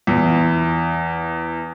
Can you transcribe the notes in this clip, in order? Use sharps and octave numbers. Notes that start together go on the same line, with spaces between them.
E2 E4